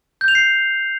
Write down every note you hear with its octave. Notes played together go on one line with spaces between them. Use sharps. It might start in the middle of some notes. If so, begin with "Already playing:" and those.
G6
F7
C7